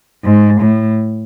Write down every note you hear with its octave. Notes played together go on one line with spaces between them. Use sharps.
G#2
A2